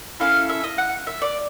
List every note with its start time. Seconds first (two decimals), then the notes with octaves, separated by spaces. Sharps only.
0.20 C#4 E4 A4 F5
0.49 E5
0.64 D#5
0.78 F#5
1.07 E5
1.22 D5